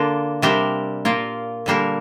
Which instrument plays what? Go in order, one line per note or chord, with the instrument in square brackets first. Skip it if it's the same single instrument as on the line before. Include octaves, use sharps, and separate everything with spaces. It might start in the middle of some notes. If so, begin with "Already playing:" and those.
Already playing: [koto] D3 A#3 D4 F4
C3 G3 D4 G4 A#4
A#2 A#3 F4 A#4
D3 G3 A#3 D4 A#4